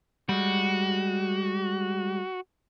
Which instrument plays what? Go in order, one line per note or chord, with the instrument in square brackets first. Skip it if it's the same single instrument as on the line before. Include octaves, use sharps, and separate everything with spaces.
[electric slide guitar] G3 G#3 [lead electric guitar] F#4